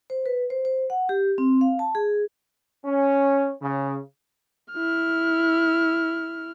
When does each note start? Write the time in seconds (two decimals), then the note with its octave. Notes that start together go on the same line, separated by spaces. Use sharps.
0.10 C5
0.26 B4
0.50 C5
0.65 C5
0.90 F#5
1.09 G4
1.38 C4
1.61 F5
1.79 A5
1.95 G#4
2.85 C#4
3.60 C#3
4.73 E4 F6